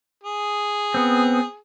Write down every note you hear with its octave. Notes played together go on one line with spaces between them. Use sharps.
G#4
B3 C4